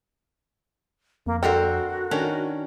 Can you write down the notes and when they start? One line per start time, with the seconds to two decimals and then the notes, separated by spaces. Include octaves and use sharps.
1.26 F2 A#3
1.43 D3 C4 F#4 A4 A#4 C5
2.11 D#3 C#4 D4 A#4